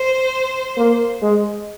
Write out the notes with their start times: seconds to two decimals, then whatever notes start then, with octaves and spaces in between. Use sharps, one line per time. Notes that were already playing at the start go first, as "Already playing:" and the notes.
Already playing: C5
0.77 A#3
1.22 G#3